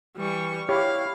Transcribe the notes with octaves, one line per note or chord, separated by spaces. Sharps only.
E3 G3 C#6
E4 G4 C#5 F5